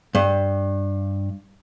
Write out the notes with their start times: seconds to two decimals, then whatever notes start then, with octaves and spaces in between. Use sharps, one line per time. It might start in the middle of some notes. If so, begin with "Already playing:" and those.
0.15 G2